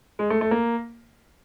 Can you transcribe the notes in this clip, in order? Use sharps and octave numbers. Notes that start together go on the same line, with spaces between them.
G#3
A3
A3
A#3